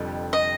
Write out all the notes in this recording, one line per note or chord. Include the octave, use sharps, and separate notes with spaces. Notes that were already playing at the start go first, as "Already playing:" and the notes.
Already playing: F1 F2 D3 G3
D#5